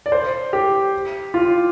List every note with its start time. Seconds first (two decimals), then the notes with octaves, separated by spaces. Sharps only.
0.06 D5
0.12 C5
0.53 G4
1.34 F4